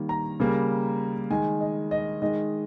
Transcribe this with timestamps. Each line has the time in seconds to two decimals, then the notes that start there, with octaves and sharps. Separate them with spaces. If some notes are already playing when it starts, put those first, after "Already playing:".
Already playing: D#3 G3 A#3
0.09 A#5
0.40 C#3 G3 A#3
1.30 D#3 G#3 G#5
1.61 D#5
1.91 D#5
2.22 D#3 G#3 D#5